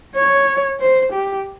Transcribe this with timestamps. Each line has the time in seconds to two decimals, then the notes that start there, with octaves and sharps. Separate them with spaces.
0.15 C#5
0.80 C5
1.13 G4